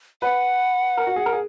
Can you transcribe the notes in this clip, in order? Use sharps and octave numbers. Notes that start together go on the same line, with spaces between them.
B4 F#5
A#4
F#4
G#4
A#4
G#4